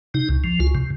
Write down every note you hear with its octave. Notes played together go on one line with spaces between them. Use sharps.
C3 D#4
C#2
F3
C#2 F4
C3